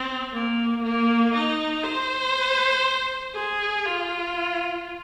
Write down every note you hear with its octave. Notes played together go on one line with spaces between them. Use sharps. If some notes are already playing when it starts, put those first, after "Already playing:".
Already playing: C4
A#3
A#3
D#4
C5
G#4
F4